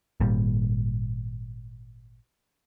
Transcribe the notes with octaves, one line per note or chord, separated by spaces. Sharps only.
G#1 A#2 G3